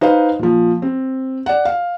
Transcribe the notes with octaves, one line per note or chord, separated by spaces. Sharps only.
D#4 B4 C5 F5
A#2 F3
C4
D5 F#5
F5